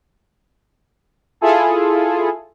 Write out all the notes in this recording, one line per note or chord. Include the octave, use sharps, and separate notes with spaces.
E4 F4 G#4 A4